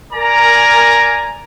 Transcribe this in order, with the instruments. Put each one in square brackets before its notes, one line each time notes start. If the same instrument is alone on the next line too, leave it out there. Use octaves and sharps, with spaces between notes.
[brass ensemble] A#4 D5 G#5 A#5